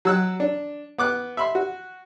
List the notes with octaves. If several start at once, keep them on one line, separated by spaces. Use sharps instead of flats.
F#3 E6 F#6
D4
B3 D6 F#6
E5 B5 C6
F#4